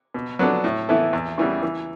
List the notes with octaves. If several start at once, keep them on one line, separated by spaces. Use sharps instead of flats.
B2
F#3 B3 D4 A4
A2
E3 B3 E4 A4
E2
C#3 E3 G3 B3
E3